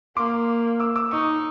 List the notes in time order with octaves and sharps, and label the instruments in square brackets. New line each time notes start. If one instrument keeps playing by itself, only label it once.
[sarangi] A#3 [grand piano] C6 D6
[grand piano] D6 E6
D6 E6
[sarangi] D#4 [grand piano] C#6 D#6